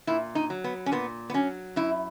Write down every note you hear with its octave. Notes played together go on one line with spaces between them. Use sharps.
A#2 E4
D#4
F#3
B3
C#4
A#2 B3
B3
F#3 C#4
F#2 E4